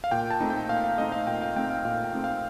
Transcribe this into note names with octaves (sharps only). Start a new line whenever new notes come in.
F5
A#2 G5
A5
A3 C4 D#4
G5
A#2 F5
F5
A3 C4 D#4 D#5
F5
A#2 G5
F5
A3 C4 D#4 G5
F5
A#2 F5
G5
A3 C4 D#4
F5